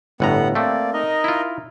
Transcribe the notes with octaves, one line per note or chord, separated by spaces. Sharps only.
G1 A2 B3 F#5 A#5
A3 A#3 C4 D5
D#4 A#4 D#5
E4 F4